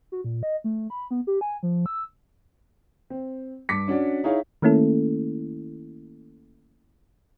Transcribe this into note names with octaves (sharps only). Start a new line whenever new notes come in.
F#4
A#2
D#5
A3
B5
B3
G4
G#5
F3
E6
C4
G2 D6 B6 C#7
C#4 D4 F#4 D5
D#4 E4 G#4 C#5 F5
D#3 A3 A#3 C#4 E4 A4